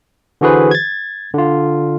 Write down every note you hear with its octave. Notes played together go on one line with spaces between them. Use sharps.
D3 E3 F#4 G#4 B4 C5
G#6 A6
D3 F4